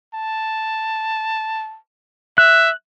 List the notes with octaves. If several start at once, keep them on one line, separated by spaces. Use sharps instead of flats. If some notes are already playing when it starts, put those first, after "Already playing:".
A5
E5 F#6